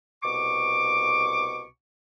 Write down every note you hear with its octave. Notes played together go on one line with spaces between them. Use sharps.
C2 B2 C#6 D6